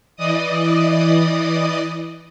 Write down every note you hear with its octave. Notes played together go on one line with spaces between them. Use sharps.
E3 D5 D#5 D#6